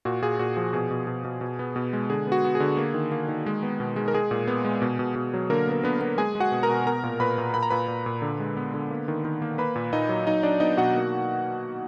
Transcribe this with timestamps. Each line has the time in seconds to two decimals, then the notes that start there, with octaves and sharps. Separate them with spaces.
0.05 A#2 F#4
0.22 A#2 G#4
0.39 A#2 F#4
0.57 F3 G#4
0.73 B2 G#4
0.91 B2
1.07 B2
1.25 B2
1.41 B2
1.59 B3
1.76 B2
1.93 G#3
2.10 D3 G#4
2.27 B3 F#4
2.44 B3
2.55 G#4
2.60 D3
2.77 A#3
2.94 D#3
3.12 A#3
3.29 D#3
3.46 G#3
3.63 B3
3.80 B2
3.96 G#3
4.08 A#4
4.14 G#3 G#4
4.31 A#2
4.47 B3
4.65 G#3
4.82 B2
4.99 B2
5.16 B2
5.34 F#3
5.50 D3 A#3 A#4
5.68 B3 A#4
5.83 D3 B3 B4
6.01 B3
6.18 G#3 G#4 G#5
6.35 G#3
6.40 F#4 F#5
6.52 B2
6.63 A#4 A#5
6.70 B2
6.86 B3 A#4 A#5
7.03 A#2
7.20 A#2 B4 B5
7.38 A#2
7.54 A#2 B5
7.63 A#5
7.70 A#2 B4 B5
7.88 A#2
8.06 A#2
8.22 D3
8.40 G#3
8.57 B3
8.74 D3
8.91 A#3
9.08 D#3
9.25 D#3
9.42 A#3
9.58 A#3 B4 B5
9.76 A#2
9.93 A#2 D#4 D#5
10.09 F#3
10.27 F#3 D#4 D#5
10.43 F#3 D4 D5
10.60 B3 D#4 D#5
10.77 B2 F#4 F#5
10.95 A#3